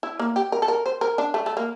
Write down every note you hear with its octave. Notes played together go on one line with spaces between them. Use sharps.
E4
A#3
G4
A#4
A4
A#4
C5
A#4
D4
A3
A3
A#3